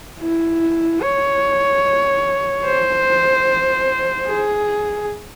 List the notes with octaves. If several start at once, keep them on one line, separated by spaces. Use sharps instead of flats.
E4
C#5
C5
G#4